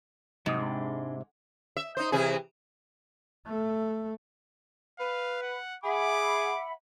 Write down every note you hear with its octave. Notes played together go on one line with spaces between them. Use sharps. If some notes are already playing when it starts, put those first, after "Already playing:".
G#2 C3 F#3 D#6
G#3 D4 B5
E5
D#4 C5
C3 E3 G#4
A3
B4 F5
F#5
G#4 E5 F#5 B5 D6